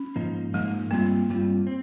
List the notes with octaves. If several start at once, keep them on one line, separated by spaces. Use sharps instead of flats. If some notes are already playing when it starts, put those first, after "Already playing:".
Already playing: C#4
G#2 F3 A#3 D#4
G#2 F3 G#3 A#3 D#4
G2 G3 A#3 C4 F4
G2 G3 C4 F4
C4